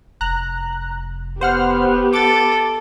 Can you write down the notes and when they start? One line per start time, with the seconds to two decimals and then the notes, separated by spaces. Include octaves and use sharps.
0.21 F1 A#5 F#6
1.41 B3 G4 C5 F#5 F6
2.13 A4 D6 A6